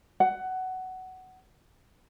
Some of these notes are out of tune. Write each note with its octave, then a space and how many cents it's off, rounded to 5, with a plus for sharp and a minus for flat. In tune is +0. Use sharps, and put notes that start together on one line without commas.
F#5 +15